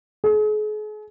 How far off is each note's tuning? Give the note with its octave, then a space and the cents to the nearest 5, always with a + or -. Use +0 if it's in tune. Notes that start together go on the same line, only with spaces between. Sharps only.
G#4 +40